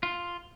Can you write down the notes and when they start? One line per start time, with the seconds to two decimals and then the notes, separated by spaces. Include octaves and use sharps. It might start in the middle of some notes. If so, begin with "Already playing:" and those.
0.03 F4